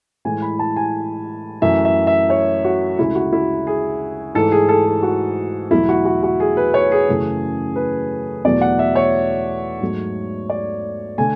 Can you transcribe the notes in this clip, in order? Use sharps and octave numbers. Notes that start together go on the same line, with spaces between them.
A2 E3 G#3 G#5
B5
A5
G#5
F#2 E3 A3 E5
E5
E5
C#5
F#4
D2 C#3 G#3 E4
F#4
E4
G#4
G#2 E3 A3 A4
G#4
A4
G#4
F#4
E2 B2 F#3 A3 E4
F#4
F#4
F#4
G#4
B4
C#5
G#4
F#2 C#3 E3 A3
B4
E2 B2 F#3 A3 D5
F#5
E5
C#5
G#2 F#3 A3
D5
D3 A3 G#5